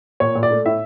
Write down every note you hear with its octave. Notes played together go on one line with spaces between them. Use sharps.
A#2 C#5
A#2
D5
A3
A2 E5